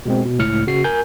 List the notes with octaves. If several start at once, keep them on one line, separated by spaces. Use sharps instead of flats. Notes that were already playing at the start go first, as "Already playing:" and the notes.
B2 G#3 C4
B2
C#2 A2 F6 C#7
C#3 F#4 C7
A#4 G#5 G6